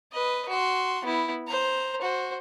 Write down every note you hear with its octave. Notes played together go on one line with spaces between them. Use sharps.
B4 D#5
F#4 C6
B3 E4
C5 A#5
F#4 C5